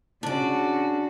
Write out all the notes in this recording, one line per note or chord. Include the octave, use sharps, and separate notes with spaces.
C#3 D4 F#4 D5